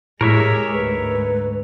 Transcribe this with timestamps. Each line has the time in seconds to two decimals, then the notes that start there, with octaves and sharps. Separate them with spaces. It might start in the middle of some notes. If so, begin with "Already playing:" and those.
0.21 A2 G#3 G4 G#4 A#4 C#5 E5
0.73 D2 G#2 B4